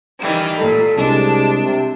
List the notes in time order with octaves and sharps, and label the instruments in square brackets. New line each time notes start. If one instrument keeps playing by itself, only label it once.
[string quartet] D#3 E3 G3
[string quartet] A#2 [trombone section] A4
[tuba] C2 [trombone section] G#3 [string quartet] D4
[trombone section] C3